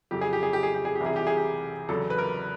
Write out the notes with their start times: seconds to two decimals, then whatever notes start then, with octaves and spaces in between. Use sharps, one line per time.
0.11 F2 C#3 F#3 G4
0.21 G#4
0.33 G4
0.43 G#4
0.53 G4
0.63 G#4
0.75 G4
0.85 G#4
0.95 G4
1.00 C2 C3 E3
1.06 G#4
1.16 G4
1.27 G#4
1.37 G4
1.89 E2 C#3 F#3 A4
2.10 B4
2.18 A#4